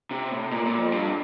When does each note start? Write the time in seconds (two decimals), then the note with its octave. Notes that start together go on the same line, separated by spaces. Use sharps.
0.11 C3
0.32 A2
0.51 A#2
0.65 A#2
0.78 F2
0.92 G2